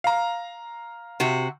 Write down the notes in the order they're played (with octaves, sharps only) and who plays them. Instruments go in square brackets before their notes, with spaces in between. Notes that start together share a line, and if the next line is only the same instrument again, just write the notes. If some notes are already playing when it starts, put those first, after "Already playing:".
[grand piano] F5 A#5
[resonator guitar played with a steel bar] C3 F#4